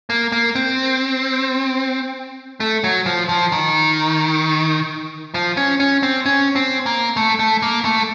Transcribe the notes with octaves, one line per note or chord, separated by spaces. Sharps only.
A#3
A#3
C4
A3
F#3
F3
F3
D#3
F3
C#4
C#4
C4
C#4
C4
A#3
A3
A3
A#3
A3